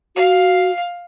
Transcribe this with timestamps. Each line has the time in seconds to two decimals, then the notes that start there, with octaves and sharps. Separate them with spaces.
0.16 F#4 F5